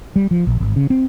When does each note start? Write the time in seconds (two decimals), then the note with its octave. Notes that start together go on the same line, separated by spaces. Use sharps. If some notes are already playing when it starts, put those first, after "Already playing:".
0.16 G3
0.31 F3
0.47 A#1
0.60 G#1
0.76 C#3
0.90 C4